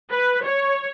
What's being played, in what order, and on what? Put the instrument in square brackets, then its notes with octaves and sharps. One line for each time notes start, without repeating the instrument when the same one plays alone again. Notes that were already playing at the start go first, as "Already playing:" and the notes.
[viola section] B4
C#5